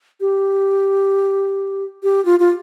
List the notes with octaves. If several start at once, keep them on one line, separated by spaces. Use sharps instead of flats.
G4
G4
F4
F4